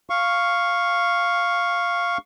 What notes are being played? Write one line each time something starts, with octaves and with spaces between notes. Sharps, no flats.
F5 C#6